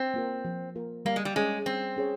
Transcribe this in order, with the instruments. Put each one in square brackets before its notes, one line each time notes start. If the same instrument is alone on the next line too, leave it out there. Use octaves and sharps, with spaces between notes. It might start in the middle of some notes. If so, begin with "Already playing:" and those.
Already playing: [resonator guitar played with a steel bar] C4
[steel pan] A#3 F4 A#4
F3
A#3 F4 A#4
[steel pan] G3 [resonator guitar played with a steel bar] A#3
[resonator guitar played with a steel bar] G#3
G3
[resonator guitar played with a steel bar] G#3 [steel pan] C#4 G#4 C#5
[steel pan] G3 [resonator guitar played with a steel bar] C4
[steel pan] C#4 G#4 C#5